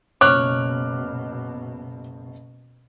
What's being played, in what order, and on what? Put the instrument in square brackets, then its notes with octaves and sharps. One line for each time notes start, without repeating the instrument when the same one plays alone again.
[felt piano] F#1 F6 [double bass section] B2 [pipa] C#5 [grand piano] D6 F#6